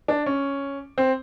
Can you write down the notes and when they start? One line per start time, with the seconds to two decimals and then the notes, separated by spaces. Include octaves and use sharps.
0.08 D4
0.26 C#4
0.98 C4